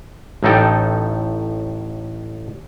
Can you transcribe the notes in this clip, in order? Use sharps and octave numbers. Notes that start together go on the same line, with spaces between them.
A1 A2 D#4 A4 G5